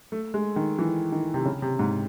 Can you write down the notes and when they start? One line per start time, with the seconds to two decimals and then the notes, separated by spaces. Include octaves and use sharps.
0.12 A3
0.34 G#3
0.56 D#3
0.79 E3
1.12 D#3
1.34 C3
1.45 C#3
1.62 C3
1.79 G#2